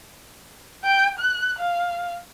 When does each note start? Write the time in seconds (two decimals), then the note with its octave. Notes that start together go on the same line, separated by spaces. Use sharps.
0.84 G5
1.19 F#6
1.59 F5